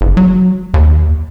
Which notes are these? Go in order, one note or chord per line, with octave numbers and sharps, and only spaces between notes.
F#1
F#3
D#2